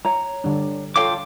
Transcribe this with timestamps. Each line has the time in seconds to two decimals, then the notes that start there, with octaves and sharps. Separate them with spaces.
0.05 C#5 A#5
0.44 D3 G3 D4
0.96 F4 A4 C#5 F5 G5 D6